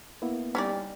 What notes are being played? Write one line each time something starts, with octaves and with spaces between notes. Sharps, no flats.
A#3 B3 E4
G3 C#4 D#4 D5